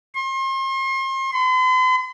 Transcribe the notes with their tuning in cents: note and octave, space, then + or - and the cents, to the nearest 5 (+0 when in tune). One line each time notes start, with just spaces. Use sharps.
C6 +40
C6 -45